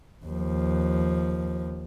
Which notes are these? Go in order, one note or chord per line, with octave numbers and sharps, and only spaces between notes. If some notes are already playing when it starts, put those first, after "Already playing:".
D#2 F3